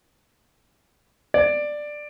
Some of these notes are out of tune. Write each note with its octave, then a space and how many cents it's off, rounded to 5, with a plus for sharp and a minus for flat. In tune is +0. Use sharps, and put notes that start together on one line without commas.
D5 +10